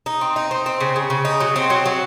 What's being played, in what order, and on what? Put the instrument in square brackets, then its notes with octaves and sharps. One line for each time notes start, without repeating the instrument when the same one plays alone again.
[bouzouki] D#4
C4
D#4
C4
C4
C#3
C#3
C#3
D#4
F#3
C4
F#3
F#3